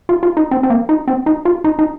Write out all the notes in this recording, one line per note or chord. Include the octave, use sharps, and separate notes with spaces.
F4
F4
D#4
C4
C4
A#3
D#4
C4
D#4
F4
D#4
D#4